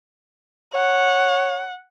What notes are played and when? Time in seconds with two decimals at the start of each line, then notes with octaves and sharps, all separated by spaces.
0.74 C#5 F#5